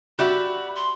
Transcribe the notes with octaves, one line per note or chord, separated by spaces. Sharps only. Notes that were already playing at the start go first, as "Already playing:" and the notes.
F#4 G4 D5 E5 B5
C6